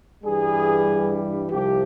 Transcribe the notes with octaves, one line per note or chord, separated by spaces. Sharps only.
G2 E3 G3 G#4
C2 C3 F3 G4